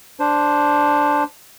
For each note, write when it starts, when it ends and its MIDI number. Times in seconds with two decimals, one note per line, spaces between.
0.20 1.24 62
0.20 1.24 72